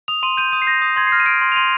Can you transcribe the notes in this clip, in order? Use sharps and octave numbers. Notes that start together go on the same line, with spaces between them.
D#6 F7
C6 D#7
G6 D#7
D#6 D#7
C7
G6 A#6
D#6
C6 G#6
C7
F6 A#6
D#7
F6 D7
C6
F7
C6 D#7